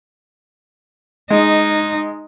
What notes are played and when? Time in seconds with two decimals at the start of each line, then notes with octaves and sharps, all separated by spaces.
1.30 G#3 D#4